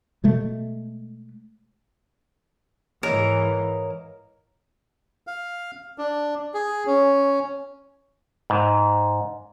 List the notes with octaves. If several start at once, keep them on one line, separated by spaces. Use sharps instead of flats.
B2 G#3 A3
G#2 E3 A#4 C#5 D#5 F5
F5
D4
G#4
C#4
G#2